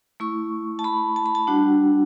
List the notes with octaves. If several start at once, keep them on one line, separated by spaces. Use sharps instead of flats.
A3 E4 C#6
A5
B5
A5
B5
A5
G3 D4 F#4 F#5